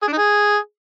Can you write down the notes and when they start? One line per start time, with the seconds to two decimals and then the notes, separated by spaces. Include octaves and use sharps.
0.02 G#4
0.07 D4
0.12 D#4
0.18 G#4